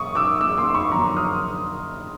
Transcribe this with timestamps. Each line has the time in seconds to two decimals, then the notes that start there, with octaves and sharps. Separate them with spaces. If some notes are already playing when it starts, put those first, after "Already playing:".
Already playing: F#2 C#6 D#6
0.15 D6 E6
0.41 D6 E6
0.58 C6 D6
0.70 C6
0.74 B5 C#6
0.91 F2 D3 F#3 A#3 A#5 C6
1.16 D#6 F6